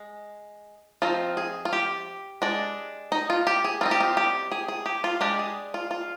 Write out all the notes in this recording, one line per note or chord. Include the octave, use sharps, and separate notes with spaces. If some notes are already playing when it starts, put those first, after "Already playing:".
Already playing: G#3
F3 C4 D#4 F4
G#4
F4
G4
G#3 D4
D#4
F4
G4
G#4
G3 C4 D#4 F4
G4
F4
G4
G#4
G#4
G4
F4
G#3 D4 G4
G#4
F4
F4